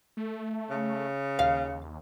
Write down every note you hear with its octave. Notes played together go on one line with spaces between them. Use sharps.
A3
C#3
D#2 F5